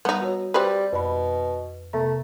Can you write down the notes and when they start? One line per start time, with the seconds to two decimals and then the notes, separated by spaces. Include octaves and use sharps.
0.05 G3 B3 D#4
0.21 F#4 C#5
0.54 G3 C4 B4
0.93 F2 B2 B5
1.93 C3 A3 B3 A#5